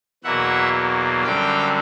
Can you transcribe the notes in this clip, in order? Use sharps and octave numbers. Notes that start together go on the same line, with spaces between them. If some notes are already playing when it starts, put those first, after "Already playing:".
E2 B2 F#3 A#3 E5 F#5
F#2 D3 G3 C4 F5 G5